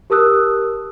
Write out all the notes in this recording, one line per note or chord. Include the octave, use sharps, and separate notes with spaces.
G4 A#4 A5 D#6 E6 F#6